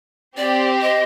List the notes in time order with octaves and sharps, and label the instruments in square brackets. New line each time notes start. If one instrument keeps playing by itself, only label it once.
[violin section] C4 G4 C5 [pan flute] D5
[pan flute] D#5